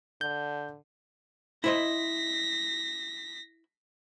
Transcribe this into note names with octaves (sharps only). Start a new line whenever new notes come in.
D3 G6
E4 C5 D#5 A#6 B6